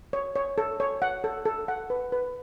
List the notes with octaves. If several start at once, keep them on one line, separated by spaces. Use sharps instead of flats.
C#5
C#5
A4
C#5
F#5
A4
A4
F#5
B4
B4